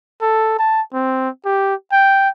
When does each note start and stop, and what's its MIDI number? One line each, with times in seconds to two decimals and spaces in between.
0.22 0.58 69
0.59 0.81 81
0.94 1.29 60
1.45 1.75 67
1.92 2.29 79